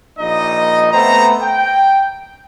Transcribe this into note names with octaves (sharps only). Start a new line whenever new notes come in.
A#1 A#3 D#4 D#5
A3 B3 C4 C5 A#5
G5